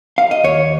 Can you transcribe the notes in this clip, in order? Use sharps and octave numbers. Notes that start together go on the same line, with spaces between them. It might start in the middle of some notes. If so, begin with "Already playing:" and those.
F5
D#5
D#2 C#5